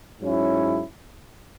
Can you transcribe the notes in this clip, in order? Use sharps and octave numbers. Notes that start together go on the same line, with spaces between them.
G#2 F#3 C#4 E4